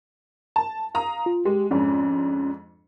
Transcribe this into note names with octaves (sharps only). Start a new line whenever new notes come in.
A5
F5 A#5 D#6
F4
G#3 G4
F2 G#2 C#4 D4